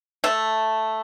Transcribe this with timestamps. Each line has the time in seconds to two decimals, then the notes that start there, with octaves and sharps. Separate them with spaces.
0.24 A3 E5